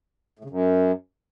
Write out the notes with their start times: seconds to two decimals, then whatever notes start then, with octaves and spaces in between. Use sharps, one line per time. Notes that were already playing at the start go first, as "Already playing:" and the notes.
0.39 A2
0.44 C#3
0.50 F#2